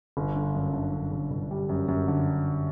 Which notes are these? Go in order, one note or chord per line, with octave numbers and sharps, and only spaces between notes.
G1
D3
F#2
D3
F#2
G1
G1
G3
F#2
F#2
D3